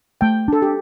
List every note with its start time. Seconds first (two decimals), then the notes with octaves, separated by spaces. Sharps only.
0.21 A3 G5
0.48 D4 A4
0.62 G4